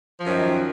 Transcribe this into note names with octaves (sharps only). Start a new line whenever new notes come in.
F#2 D#3 F3